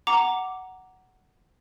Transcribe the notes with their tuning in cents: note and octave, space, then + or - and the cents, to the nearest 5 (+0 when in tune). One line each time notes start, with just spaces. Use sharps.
F#5 +10 A#5 +0 D6 -5